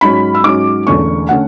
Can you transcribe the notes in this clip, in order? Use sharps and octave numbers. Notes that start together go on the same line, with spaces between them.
G#2 F#3 C#4 B5
E6
G#2 F#3 C#4 D6
E1 E2 D3 A3 C#4 C#6
D3 A3 C#4 F#5